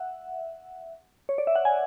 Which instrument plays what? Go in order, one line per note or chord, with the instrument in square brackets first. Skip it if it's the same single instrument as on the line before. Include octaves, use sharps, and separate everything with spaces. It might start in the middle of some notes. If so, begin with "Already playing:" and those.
Already playing: [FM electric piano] E5 F#5
C#5
D5
E5
F#5
G#5